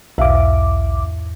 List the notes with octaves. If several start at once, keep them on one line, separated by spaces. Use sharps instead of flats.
B1 E2 G#2 E5 F5 D6